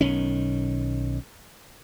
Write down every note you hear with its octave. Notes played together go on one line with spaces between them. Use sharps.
B1 D#3 C#4